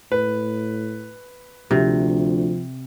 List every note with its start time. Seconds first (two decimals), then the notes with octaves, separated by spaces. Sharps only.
0.12 A2 B4
1.71 D2 C3 F3